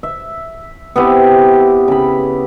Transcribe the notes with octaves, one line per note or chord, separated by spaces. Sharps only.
E5
B3 C4 E4 G4
C#3 B5